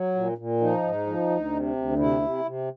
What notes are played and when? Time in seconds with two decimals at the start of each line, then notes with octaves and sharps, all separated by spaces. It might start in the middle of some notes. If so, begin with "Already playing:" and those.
Already playing: F#3
0.15 A#2
0.38 A#2
0.61 F3 D#4
0.83 G#2
1.06 F3
1.30 D2
1.53 C3
1.76 D2
1.99 C3 E4
2.21 C3
2.45 C3